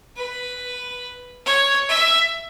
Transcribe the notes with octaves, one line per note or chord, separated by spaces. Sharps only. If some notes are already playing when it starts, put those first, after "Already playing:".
B4
C#5
E5